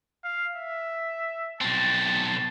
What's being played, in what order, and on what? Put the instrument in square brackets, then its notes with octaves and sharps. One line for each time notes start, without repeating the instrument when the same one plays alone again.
[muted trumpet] F5
E5
[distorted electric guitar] B1 C4 [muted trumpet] A5